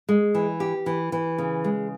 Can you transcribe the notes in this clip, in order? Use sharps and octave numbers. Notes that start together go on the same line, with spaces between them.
G#3
E3
G4
E3
E3
C#3
G#3